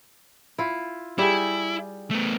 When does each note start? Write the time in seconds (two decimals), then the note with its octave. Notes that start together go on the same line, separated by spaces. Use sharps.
0.58 E4 F4
1.18 G3 E4 G#4
2.11 A3 B3